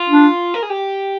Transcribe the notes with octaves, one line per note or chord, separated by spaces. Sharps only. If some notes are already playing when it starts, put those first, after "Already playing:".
Already playing: F4
D4
A#4
G#4
G4